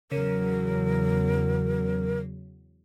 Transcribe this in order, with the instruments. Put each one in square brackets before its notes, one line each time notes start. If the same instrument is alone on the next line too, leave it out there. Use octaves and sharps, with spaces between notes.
[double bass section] E2 F#3 [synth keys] C#3 [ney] A#4